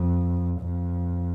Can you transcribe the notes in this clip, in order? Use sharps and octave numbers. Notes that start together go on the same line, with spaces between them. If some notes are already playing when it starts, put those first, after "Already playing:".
Already playing: F2
F2